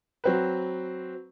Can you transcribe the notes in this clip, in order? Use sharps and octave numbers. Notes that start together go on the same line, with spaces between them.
F#3 C4 B4